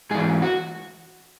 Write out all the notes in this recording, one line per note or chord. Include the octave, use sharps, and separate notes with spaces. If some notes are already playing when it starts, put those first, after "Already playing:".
G#2 E3 G#4
F#4